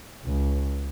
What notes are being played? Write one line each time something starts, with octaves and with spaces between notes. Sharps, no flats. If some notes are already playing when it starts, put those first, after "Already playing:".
C#2